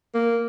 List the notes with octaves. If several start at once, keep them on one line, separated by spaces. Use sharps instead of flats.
A#3